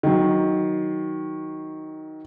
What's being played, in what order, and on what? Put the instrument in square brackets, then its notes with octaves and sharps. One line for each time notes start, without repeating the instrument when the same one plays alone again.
[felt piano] D#3 F#3